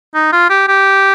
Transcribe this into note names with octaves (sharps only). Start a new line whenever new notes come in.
D#4
F4
G4
G4